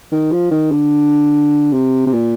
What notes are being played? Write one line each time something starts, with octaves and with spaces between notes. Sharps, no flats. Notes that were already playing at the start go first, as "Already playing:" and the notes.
D#3
F3
D#3
D3
C3
C3
A#2